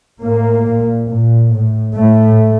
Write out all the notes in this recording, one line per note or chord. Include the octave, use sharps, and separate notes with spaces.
A2 A#3
A#2
A#2
A2
A2 A3